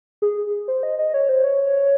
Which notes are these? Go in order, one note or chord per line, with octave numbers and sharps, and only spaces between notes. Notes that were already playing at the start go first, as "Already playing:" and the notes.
G#4
C5
D#5
D#5
C#5
C5
C#5